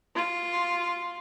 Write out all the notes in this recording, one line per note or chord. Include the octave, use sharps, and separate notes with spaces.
F4